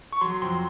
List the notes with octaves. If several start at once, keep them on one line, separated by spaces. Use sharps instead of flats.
C#6
F#3 C6
F2 C6